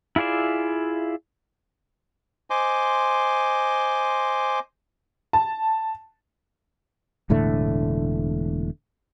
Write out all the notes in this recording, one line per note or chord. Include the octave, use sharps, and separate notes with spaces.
E4 F4 G#4 D5 E5
C5 D#5 G#5 C6 D6
A5
E1 A2 D3 A3